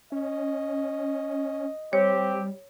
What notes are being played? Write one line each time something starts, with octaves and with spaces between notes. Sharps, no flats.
C#4 D#5
G3 C4 G4 C#5